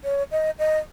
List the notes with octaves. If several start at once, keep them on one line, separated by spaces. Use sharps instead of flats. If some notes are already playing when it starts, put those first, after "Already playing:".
C#5
D#5
D#5